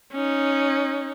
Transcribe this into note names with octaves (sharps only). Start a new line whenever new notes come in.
C#4 D#4